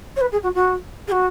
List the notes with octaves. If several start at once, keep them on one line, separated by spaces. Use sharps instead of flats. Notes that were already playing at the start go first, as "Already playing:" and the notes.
C#5
B4
G#4
F#4
F#4
G#4
F#4